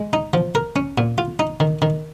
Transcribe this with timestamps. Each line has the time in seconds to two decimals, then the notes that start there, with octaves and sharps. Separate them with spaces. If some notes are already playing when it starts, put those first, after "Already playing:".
Already playing: G#3
0.13 D#4
0.34 F3
0.55 A#4
0.76 C#4
0.98 A#2
1.18 F4
1.39 D#4
1.60 D#3
1.82 D#3